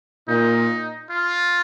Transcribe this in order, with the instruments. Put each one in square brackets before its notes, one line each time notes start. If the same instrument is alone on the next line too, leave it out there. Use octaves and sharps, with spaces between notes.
[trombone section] A#2 [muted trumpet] D#4
[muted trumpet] F4